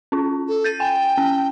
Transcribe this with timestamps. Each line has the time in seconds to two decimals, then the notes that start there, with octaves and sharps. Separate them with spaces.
0.12 C#4 F4
0.48 A4
0.64 G6 A6 D#7
0.80 G5 G#5
1.18 C#4